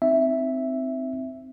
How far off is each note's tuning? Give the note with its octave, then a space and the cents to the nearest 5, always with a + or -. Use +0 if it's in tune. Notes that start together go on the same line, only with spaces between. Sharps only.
C4 -10 D#4 +0 E5 +0